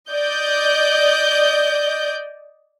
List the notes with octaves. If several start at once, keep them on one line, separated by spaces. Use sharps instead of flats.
D5 D#5 G6